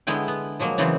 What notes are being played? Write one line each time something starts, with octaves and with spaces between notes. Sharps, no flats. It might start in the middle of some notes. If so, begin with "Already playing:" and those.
D3 G#3 B3 E4 G5
B3
F3 F#3 G#3 A#3
C#3 E3 F#3 G#3 C4